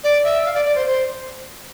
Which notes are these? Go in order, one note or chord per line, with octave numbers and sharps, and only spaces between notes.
D5
E5
F5
D5
D5
C5
C5